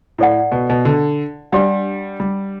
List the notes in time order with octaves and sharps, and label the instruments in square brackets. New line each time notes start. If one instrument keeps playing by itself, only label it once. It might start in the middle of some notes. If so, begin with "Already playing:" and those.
[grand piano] A2 [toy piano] E4 A4 D5 F#5
[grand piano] B2
B2
D3
[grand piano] G3 [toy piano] D4 G4 D5 F#5
[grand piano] G3